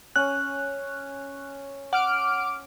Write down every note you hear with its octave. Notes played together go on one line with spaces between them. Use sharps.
C#4 F#6
F#5 D6 F6 D7